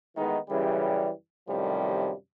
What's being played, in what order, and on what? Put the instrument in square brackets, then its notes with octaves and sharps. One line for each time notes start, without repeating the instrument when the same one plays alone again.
[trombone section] D#3 E3 G#3 A3 B3 D#4
F#2 C#3 E3 G3
F#2 A2 C3 D#3 F3 G3